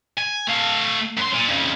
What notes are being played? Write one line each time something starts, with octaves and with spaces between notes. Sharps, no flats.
G#5
A3 F5
F#2 C6
A#2
F2 C#3